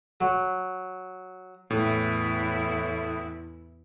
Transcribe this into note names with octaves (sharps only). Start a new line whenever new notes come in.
F#3
E2 A2 E4